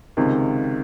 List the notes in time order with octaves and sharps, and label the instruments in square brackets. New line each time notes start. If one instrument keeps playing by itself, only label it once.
[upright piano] C#2 C3 D#3